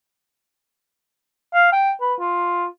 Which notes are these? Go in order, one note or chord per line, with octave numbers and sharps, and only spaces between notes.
F5
G5
B4
F4